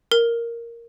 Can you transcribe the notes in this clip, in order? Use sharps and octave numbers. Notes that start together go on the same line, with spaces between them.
A#4